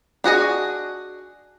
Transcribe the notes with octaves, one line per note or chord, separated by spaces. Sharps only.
D4 F#4 G#4 D#5